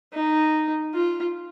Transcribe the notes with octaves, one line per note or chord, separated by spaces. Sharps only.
D#4
F4